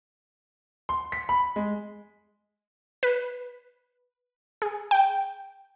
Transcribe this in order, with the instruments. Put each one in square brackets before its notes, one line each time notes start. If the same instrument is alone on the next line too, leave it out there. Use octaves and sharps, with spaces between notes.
[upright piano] C6
B6
B5
G#3
[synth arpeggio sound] B4
G#4
G5